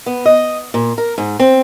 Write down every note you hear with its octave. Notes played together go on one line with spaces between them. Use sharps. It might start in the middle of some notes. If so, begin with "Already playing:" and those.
B3
D#5
A#2
A#4
G#2
C4